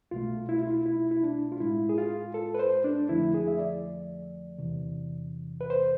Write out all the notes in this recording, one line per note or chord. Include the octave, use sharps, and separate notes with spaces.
C2 B2 A3 F4
E4
F4
E4
E4
E4
D4
F4
A2 G#3 E4
G#4
F4
A4
B4
C5
D4
F2 D3 F3 A3 E4
G#4
E5
D5
E2 C3 E3
B4
C5